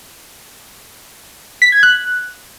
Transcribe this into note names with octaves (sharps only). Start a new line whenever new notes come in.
B6
G#6
F#6